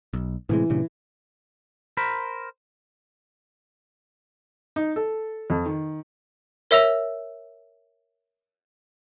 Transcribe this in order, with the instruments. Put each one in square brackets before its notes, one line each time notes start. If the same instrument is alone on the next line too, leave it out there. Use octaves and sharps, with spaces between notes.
[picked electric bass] B1
[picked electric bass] A2 C3 G#3 [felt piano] E3
[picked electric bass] G2 A#2 C#3
[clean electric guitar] A#4 C5 B5
[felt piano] D#4
A4
F2
D#3
[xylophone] A#4 C#5 E5 E6 A#6 F7